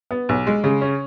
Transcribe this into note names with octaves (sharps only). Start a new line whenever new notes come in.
B3
B1
G#3
C#3
C#4